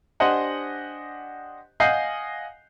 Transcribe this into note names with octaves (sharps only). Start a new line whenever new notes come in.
D4 G4 C5 D#5 F#5 G#5
D#5 F5 F#5 G#5 G6 C7